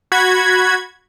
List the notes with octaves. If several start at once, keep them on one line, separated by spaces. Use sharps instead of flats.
F#4 B5 G#6